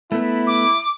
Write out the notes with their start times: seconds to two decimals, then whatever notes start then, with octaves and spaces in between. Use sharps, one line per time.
0.12 A3 B3 E4
0.47 D6